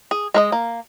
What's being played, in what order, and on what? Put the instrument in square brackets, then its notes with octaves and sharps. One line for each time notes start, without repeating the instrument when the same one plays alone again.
[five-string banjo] G#4
G#3 A#4 D#5
A#3